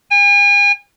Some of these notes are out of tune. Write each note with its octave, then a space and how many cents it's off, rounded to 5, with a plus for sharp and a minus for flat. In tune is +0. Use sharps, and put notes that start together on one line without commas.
G#5 -40